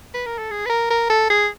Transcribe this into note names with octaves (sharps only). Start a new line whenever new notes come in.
B4
A#4
A4
G#4
B4
A#4
A#4
A4
G#4